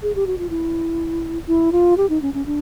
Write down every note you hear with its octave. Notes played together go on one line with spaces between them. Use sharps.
G#4
G4
F#4
F4
E4
E4
F4
G4
D#4
C#4
C#4
D4